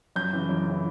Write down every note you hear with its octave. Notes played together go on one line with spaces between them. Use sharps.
F#2 G6
C#3 E3
F#2
C#3 E3